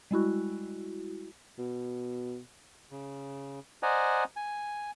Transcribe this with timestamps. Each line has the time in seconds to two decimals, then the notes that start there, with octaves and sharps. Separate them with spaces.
0.11 G3 G#3 E4 F#4
1.59 B2
2.91 C#3
3.83 C5 D5 D#5 F#5 G#5 A#5
4.36 G#5